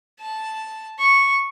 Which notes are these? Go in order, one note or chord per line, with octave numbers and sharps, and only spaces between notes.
A5
C#6